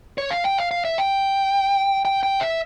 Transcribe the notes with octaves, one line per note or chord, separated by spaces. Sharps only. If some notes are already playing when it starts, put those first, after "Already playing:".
C#5
F5
G5
F5
F5
E5
G5
G5
G5
E5